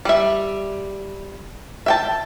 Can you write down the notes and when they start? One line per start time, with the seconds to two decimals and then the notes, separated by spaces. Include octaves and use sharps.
0.05 G3 E5
1.86 E5 G5 A5